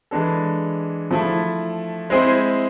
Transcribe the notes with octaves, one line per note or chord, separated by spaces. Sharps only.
E3 G#3 D4 A4
F3 A3 E4
G#3 C4 E4 G#4 C5